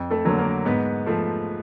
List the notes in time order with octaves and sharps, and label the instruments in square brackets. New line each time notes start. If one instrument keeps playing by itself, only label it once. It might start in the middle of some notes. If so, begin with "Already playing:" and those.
Already playing: [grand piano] F2
A3 A4
D3 F#3 A#3
A#3 A#4
G#2 B3 B4
F3 A3